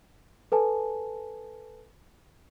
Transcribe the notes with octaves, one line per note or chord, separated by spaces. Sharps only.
A4 B4 G#5 A5